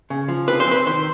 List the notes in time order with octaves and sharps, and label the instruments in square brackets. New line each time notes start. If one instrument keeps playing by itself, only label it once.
[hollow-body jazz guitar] C#3
F3
C4 B4
C5
C4 B4
D#3 C5